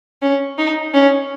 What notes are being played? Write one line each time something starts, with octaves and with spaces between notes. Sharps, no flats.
C#4
D#4
C#4